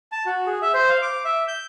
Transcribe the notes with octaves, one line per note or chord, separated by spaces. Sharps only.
A5
F#4
G#4
E5
C5
F5
D6
E5
G6